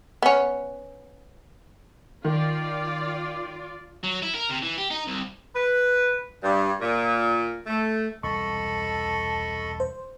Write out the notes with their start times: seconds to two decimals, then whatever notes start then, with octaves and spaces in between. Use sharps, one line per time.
0.22 B3 C#4
2.24 D#3 F4 D5
4.03 F#3
4.22 E4
4.34 A#4
4.49 C3
4.62 E3
4.78 G4
4.91 D#4
5.07 C2
5.55 B4
6.42 G2
6.81 A#2
7.67 A3
8.23 E1 C2 A4 D#5 A5 B5 C#6
9.80 C5